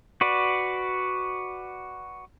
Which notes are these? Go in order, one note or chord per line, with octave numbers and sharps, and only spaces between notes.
F#4 B4 D5